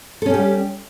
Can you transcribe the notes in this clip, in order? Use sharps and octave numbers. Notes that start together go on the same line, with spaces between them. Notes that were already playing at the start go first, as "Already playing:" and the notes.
G3 C#4 G4 A4